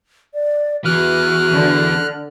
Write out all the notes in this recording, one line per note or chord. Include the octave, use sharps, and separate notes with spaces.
D5
E2 E3 F#4 F6 F#6
D3